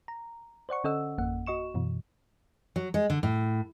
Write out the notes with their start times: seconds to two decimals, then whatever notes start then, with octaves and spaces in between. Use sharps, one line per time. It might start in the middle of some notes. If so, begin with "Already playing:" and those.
0.08 A#5
0.69 C5 D5 F#5 C#6
0.84 D3 C#4 A4 D#5 F#5 E6
1.18 G#1 F2 A#3 F#5
1.46 F#4 D#5 C#6 E7
1.74 F#2 B2 E3
2.76 F#3
2.94 G#3
3.10 D3
3.23 A2